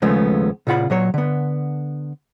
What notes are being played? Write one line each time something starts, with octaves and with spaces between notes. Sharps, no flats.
D#2 C#3 F3 G#3 A3 B3
A#2 C#3 F4 F#5 B5
A#2 F#3 C#5
D3 B3